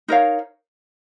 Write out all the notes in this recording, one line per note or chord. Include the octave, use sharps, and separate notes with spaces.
D#4 A#4 C#5 F5